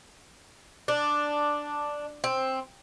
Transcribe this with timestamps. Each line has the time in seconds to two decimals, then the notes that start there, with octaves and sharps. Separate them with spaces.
0.88 D4
2.24 C4